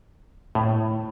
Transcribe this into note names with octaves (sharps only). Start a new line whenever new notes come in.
A2